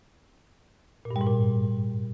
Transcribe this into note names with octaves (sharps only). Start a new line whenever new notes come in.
A#2
G2
G3
G#2
A#2